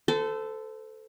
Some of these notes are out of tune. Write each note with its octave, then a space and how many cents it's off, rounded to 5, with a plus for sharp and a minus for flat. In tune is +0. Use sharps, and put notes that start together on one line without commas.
A4 +0 C5 -35